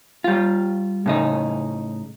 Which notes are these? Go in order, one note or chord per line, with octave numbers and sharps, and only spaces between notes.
G3 F4
A2 C#3 D#4